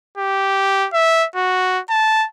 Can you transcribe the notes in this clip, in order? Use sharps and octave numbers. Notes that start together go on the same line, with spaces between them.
G4
E5
F#4
A5